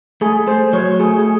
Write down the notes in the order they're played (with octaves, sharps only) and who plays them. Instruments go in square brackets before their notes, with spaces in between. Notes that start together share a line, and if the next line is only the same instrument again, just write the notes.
[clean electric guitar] A3 [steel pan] G#4
[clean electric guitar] A3 [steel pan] C5
[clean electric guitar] F#3 [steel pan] C#5
[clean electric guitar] A3 [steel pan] G#4
[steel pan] G#4